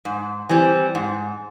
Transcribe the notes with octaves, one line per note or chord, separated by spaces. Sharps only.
G#2
E3 G3 C4
G#2